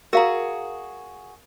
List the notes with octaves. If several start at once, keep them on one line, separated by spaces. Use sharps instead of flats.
F#4 G#4 A#4 F5 A#5